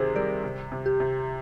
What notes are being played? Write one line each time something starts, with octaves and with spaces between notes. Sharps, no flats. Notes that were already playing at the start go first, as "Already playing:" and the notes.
Already playing: C3 D#3 C4 G4 G#4 C5
G3 A#4 D5
C3
C3
G4
C3